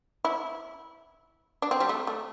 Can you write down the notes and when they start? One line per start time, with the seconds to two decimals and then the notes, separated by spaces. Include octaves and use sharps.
0.25 E4
1.62 D4
1.71 C4
1.80 G3
1.89 A3
2.07 A3